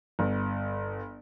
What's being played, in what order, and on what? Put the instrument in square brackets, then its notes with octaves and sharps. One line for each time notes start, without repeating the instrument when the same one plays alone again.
[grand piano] G1